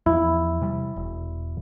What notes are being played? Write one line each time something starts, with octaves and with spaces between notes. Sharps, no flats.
E2 F3 E4
C3 G3
E1